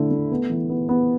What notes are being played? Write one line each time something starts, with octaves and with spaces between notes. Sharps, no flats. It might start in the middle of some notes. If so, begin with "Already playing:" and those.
Already playing: D3 A3 E4
A3
B3
E3
B3
B3